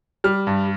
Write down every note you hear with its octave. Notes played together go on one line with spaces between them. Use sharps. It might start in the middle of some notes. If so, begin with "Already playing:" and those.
G3 F6
G2